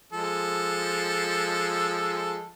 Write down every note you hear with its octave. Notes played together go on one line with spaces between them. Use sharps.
F3 G#3 A4